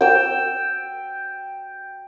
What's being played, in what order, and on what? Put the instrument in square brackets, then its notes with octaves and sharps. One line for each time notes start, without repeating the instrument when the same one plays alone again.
[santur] G5 E6